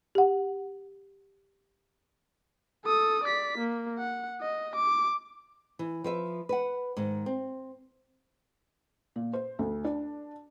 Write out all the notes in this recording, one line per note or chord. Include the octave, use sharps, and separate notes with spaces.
G4 F#5
A4 D#6
D5 B6
A#3
F#5
D#5
D6
E3
F3 B4 E5
B4 F#5
G#2 D#3
C4
A#2
C5
D2
D4